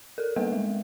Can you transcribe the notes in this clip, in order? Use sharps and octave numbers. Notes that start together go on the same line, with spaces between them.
A4 A#4
G3 A#3 B3 B4 F#5
G#3